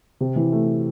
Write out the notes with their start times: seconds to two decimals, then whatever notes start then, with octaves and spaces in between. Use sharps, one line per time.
0.21 C3
0.36 E3
0.52 A3